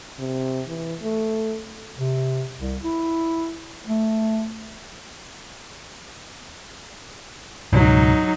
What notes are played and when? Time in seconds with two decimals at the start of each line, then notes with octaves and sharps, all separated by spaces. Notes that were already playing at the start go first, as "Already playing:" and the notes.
0.19 C3
0.67 E3
1.02 A3
1.99 C3
2.59 C2
2.84 E4
3.87 A3
7.72 C#2 G#2 B2 F#3 D#4